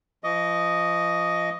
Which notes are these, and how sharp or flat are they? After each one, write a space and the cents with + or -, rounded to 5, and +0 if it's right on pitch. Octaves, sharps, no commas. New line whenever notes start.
F3 -25 D#5 +0 C#6 +45